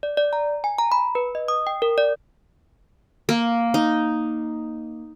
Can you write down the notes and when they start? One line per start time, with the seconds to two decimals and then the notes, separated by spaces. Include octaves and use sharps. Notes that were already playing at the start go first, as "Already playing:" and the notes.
0.03 D5
0.17 D5
0.33 A#5
0.64 G#5
0.79 A#5
0.92 B5
1.15 B4
1.35 D#5
1.48 D#6
1.67 G5
1.82 A#4
1.98 D5
3.29 A#3
3.74 D#4